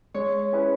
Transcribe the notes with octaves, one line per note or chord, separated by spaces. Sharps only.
G#3 C#5
C#4 E4 G#4 B4